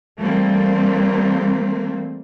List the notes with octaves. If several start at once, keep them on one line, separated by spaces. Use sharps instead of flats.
E3 G3 A3 A#3 C4